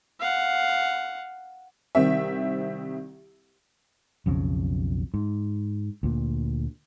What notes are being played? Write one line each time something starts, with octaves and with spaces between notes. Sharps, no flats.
F5 F#5
C2 D#3 C4 E5
B1 F2 C#3
G#2
D2 A#2